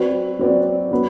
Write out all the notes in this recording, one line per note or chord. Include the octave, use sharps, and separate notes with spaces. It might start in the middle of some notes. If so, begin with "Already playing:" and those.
Already playing: F#3 C4 F#4 B4 D5
F#3 C4 F#4 B4 D5
F#3 B3